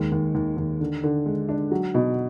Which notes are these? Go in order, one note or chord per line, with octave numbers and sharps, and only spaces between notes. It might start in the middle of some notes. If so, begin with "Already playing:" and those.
Already playing: D#2 G#3
D#2
D#2
D#2
D3
D3
G#3
D4
F#3
B2